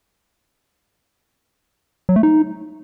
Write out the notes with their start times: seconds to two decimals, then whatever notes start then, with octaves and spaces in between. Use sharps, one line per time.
2.09 F#3
2.16 A3
2.23 D#4